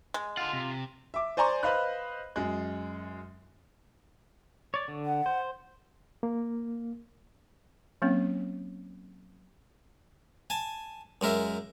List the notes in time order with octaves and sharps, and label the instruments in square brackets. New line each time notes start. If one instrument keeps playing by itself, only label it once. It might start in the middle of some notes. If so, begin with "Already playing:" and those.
[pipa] G#3
[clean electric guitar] F4 [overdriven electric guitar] A4 F#5
[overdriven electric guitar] C3
[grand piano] E5 D6
C5 D5 G#5 A#5 C6 C#6
B4 C5 D#5 F5 B5 F#6
F#2 G#3
[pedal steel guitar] C#5 D5
D3
[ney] F#5
[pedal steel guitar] C5
[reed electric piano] A#3
[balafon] F#3 A#3 C4 C#4
[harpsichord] G#5 A5
F#2 G#3 A#4 E5